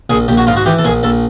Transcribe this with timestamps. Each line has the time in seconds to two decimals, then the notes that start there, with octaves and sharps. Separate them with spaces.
0.10 A#1 G#4
0.28 A#1 G4
0.37 F#4
0.47 G#2 F4
0.56 F#4
0.66 E3 G4
0.79 A4
0.84 A#1 G#4
1.03 A#1 A4